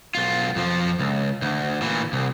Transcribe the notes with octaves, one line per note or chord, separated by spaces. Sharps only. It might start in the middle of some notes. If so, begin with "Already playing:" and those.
B1 F4
F2 F3
C#2
D2
A#2 E3
C2